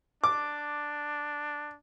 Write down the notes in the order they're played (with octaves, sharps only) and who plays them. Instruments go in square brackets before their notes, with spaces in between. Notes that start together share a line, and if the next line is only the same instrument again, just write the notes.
[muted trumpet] D4 [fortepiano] D6